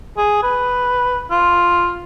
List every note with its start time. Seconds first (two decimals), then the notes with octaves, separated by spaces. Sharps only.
0.17 G#4
0.43 B4
1.31 F4